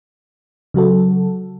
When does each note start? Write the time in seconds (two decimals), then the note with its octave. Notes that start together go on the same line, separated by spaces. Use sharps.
0.74 C#3 F#3 F#4 A4